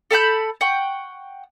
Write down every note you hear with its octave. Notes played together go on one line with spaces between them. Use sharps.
A4 A5 B5 G6
F#5 G5 C#6